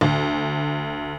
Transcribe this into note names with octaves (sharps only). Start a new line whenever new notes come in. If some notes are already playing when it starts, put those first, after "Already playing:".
D2